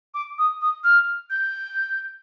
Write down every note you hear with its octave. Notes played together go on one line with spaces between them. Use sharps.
D6
D#6
D#6
F6
G6